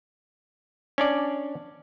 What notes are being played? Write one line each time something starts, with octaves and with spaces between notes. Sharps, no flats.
C#4 D4 D5